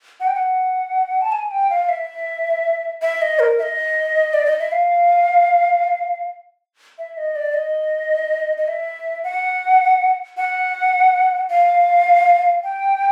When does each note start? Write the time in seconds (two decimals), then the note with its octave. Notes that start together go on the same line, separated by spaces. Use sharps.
0.20 F#5
0.27 G5
0.35 F#5
1.22 A5
1.32 G#5
1.51 G5
1.70 F5
1.89 E5
3.02 E5
3.22 D#5
3.39 A#4
3.58 E5
3.63 D#5
4.34 D5
4.46 D#5
4.59 E5
4.72 F5
6.98 E5
7.17 D#5
7.36 D5
7.54 D#5
8.57 D#5
8.68 E5
9.24 F#5
10.37 F#5
11.50 F5
12.64 G5